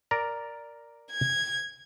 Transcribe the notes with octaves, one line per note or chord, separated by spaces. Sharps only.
A#4 D5 A#5
G#6